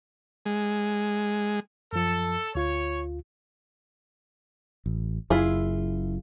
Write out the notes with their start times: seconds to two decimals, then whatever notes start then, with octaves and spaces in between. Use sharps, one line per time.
0.46 G#3
1.93 F#2 F3 A4
2.55 D2 F4 C#5
4.86 A1
5.30 F#1 F#2 E4 F4 G#4